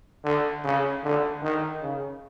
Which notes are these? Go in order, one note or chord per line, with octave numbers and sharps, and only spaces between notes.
D3
C#3
D3
D#3
C#3